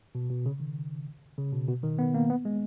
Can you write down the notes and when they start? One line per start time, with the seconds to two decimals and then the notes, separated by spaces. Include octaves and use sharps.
0.15 B2
0.30 B2
0.46 C#3
0.60 D#3
1.38 C#3
1.53 B2
1.68 B2
1.83 D#3
1.99 B3
2.14 A#3
2.30 B3
2.45 G#3